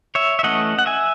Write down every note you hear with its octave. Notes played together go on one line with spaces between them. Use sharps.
C#5 E5
E5
E3 A3 C#4 D#5 F#5
F#5
E5 G#5